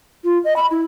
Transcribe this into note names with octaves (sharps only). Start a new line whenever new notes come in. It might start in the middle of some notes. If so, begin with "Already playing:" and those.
F4
D#5
B5
E4